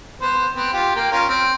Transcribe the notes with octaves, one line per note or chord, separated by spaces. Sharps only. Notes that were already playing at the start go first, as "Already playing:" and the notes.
B3 C5
B3 C4
F4 G4
A#3 G5
C#4 F4 A#4
C4